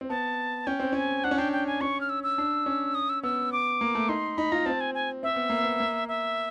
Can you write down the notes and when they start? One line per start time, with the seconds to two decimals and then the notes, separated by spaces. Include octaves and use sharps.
0.01 C4
0.09 B3 A5
0.67 C#4 G5
0.80 C4
0.93 C#4 G#5
1.24 D4 F#5
1.31 C#4
1.38 D4 G5
1.52 G5
1.67 G#5
1.81 C#4 C#6
2.01 F6
2.09 E6
2.23 E6
2.38 D4
2.66 C#4
2.95 D#6
3.09 E6
3.23 B3 E6
3.52 D6
3.81 A#3
3.95 A3
4.09 D#4 C6
4.38 D#4 B5
4.52 F4 A#5
4.66 C4 A5
4.81 G#5
4.95 G#5
5.23 C4 E5
5.36 B3
5.50 A#3
5.63 B3
5.80 A#3
6.08 E5